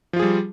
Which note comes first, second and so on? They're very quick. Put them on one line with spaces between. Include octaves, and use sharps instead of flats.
F3 F4 G#4 G3